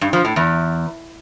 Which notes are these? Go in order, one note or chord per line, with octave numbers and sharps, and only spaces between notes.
G2
F3
A2
E2